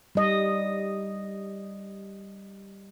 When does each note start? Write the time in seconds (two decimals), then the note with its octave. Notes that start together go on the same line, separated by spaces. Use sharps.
0.15 G3 D#5